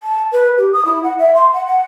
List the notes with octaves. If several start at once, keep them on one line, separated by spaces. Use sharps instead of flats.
A5
B4
G4
D#6
E4
F#5
E5
C6
F#5
F#5